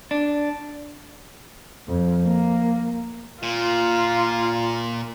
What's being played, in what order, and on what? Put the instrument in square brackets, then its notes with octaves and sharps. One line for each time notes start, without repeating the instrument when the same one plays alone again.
[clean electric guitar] D4
[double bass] F2
A#3
[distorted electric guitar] A#2 [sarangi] F4